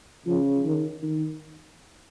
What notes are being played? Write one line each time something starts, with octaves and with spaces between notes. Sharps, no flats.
C#3 F3
D#3
D#3